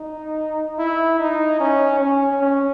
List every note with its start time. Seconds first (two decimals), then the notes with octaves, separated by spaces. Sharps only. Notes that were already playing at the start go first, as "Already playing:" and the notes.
Already playing: D#4
0.79 E4
1.20 D#4
1.60 C#4
2.01 C#4
2.42 C#4